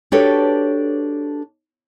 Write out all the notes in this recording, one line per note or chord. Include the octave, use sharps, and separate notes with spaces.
D4 F#4 G4 A4 B4 C#5